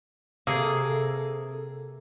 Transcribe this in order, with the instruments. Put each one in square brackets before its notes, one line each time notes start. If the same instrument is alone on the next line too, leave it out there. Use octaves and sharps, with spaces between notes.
[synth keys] C3 A4 [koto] A#3 G#4